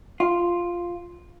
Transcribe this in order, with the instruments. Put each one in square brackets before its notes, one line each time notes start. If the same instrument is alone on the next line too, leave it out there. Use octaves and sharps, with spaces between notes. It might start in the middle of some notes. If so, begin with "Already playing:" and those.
[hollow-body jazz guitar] F4